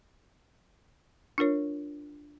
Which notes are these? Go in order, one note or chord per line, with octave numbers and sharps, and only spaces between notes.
D4 F4 A#4 C#5